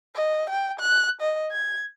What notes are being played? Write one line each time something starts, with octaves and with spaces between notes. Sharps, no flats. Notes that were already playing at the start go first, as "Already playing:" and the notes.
D#5
G5
F#6
D#5
G#6